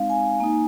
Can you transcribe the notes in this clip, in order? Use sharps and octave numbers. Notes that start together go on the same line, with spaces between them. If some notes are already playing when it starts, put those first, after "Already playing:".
Already playing: G#3 C4 D#4 F5
G#5
A#3 D#4